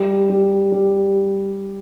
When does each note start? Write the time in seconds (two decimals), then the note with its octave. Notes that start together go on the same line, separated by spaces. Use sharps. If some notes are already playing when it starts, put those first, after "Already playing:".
Already playing: G3
0.29 G3
0.72 G3